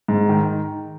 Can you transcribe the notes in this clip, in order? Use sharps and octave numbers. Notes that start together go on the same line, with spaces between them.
G#2
D#3